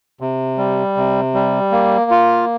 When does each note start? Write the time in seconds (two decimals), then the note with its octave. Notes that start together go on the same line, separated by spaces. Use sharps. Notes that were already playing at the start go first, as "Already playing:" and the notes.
0.21 C3
0.58 G3
0.97 C3
1.34 G3
1.72 A#3
2.11 F4